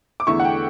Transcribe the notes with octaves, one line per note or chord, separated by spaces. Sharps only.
D6
E2 D3 A3 E4 C#6
F#5
G5